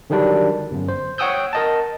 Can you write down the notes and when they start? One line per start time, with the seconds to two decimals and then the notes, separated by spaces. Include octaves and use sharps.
0.10 D3 D#3 F#3 G3 D4
0.71 G1 F#2
0.88 C5
1.18 C#5 F#5 G5 D#6 E6 G6
1.53 A#4 D#5 A5